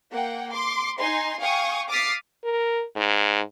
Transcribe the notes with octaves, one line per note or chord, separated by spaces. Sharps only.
A#3 F#5 G5
C6 D6
D#4 G#5 C6
F5 G5 G#5 C#6 D#6
D6 D#6 F6 A6 B6 C7
A#4
G#2